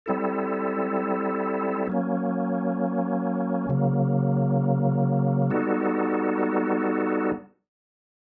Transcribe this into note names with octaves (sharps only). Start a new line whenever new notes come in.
G3 C4 E4 A4
F#3 A#3 C#4
C#3 F#3 A#3
G3 B3 D#4 F#4 A4